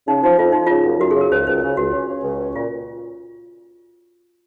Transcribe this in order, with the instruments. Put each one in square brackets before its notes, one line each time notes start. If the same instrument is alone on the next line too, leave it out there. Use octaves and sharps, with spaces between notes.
[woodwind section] C#3 [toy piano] D#4
[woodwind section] F3 [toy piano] D#4
[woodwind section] F2 [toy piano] F4
[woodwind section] F3 [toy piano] D#4
[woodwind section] C#3 [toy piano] F4
[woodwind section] F#2
[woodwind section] F#2 [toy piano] F#4
[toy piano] G#4
[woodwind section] C#3
[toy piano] A#4
[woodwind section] C#2 [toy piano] C5
[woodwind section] C#2 [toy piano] C5
[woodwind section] C#3
[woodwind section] C#2 [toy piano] F#4
[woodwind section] C#4
C#4
C#2
C#4
[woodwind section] A#2 [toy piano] F4